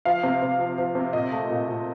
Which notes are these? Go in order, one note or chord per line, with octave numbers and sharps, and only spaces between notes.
F3 F5
C3
C3
F3
F3
C3
A#2 D#5
A3
A#2
A#2